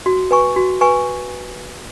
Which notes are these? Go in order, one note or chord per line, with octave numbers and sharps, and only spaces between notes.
F#4
B4 G#5 C#6
F#4
B4 G#5 C#6